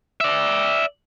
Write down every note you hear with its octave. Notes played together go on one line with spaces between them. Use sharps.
D5 E5